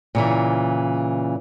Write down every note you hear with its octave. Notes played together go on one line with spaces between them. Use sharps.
A#2 C#3 E3